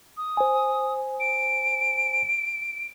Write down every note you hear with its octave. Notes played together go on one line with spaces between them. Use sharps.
D#6
C5 G#5
D7